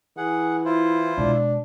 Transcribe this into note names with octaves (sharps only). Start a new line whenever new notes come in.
E3 G#4 F#5
E4 F4 C5
B2 G#3 D4